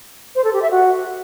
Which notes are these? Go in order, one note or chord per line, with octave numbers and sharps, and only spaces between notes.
C5
A4
G4
E5
F#4